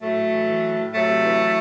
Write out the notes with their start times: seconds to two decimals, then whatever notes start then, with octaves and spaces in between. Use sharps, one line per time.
0.01 A2 F#3 A3
0.18 A2
0.32 E3
0.48 E3
0.63 A2
0.78 A2
0.93 C3 F#3 A3
1.08 C3
1.24 E3
1.39 E3